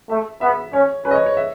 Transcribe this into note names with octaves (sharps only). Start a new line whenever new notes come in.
A3 E5
B3 E5
C#4 C#5
C#4 B4
D#5
C#5
C#5
E5